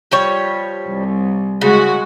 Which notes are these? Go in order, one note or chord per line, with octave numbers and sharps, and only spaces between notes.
F3 G3 C#5
C2
C#3 G#3 F#4